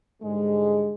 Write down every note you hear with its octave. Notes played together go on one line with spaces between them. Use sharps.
G#2 D3 G3 G#3